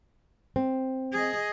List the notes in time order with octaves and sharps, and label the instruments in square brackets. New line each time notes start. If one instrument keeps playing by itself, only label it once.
[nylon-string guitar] C4
[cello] G#4 D#5